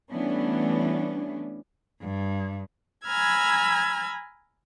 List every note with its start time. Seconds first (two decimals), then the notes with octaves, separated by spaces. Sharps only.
0.10 E3 G3 A3 B3 C#4 D4
2.01 G2
3.05 G#5 A#5 B5 E6 F6 G#6